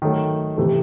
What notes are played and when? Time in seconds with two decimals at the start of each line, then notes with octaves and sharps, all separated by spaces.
0.02 D#3 F#3 A3
0.57 C3 E3 A3